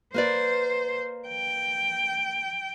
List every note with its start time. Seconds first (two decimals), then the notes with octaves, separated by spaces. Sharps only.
0.14 A#3 B4 C5 D5
1.28 G5